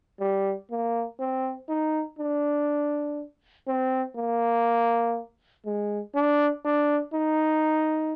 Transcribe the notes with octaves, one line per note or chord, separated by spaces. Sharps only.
G3
A#3
C4
D#4
D4
C4
A#3
G#3
D4
D4
D#4